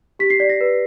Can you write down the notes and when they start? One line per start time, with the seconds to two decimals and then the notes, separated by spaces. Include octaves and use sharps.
0.19 G4 B6
0.30 C7
0.40 D5 B6
0.49 A#6
0.61 B4